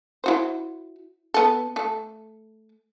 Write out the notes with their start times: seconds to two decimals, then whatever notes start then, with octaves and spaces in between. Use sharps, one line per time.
0.24 E4 F#4 C5
1.34 B3 A4
1.76 A3 A4